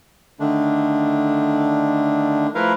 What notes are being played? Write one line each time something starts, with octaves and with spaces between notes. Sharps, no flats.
D3 D#3 A3 D4
F3 A3 E4 A#4 B4 F5